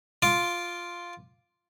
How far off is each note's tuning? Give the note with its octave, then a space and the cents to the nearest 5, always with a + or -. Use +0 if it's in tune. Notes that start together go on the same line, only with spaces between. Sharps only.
F4 +0 D6 +0